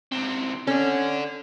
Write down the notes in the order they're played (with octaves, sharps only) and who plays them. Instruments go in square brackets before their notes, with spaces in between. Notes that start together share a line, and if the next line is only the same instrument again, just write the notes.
[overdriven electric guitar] C#2 C4
[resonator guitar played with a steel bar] C#4 [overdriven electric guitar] A4 D5